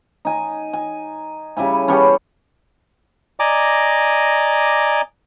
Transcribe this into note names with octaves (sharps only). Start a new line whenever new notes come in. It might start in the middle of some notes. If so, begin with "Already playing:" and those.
D#4 G#5
G#5
C#3 G3 E4 G#5
G3 B3 C#4 A4
D5 D#5 G#5 A#5 D6